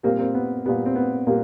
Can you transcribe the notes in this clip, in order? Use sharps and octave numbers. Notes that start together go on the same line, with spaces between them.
A#2 G3 A#3 C4
A#3 C4
B3
A#2 G3 B3
C4
B3
A#2 G3 A#3